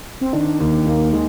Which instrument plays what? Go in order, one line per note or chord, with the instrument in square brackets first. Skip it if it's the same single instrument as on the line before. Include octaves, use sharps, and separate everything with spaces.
[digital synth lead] C4
[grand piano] D#3 [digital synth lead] D4
[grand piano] D#2
[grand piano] D#3 [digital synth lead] A#3
[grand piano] D#3 [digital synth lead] G#3